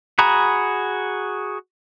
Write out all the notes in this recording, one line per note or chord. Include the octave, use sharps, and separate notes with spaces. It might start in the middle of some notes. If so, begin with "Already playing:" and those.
F#4 G#4 A#5 B5